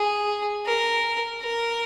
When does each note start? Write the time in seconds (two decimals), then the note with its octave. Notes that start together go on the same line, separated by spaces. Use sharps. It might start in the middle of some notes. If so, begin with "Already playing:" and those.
Already playing: G#4
0.66 A#4
1.41 A#4